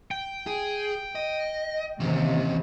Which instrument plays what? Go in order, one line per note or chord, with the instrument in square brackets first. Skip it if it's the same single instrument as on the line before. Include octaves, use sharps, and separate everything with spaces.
[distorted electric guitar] G5
[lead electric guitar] G#4
D#5
[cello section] D#2 C3 D#3 [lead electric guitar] E3 C#4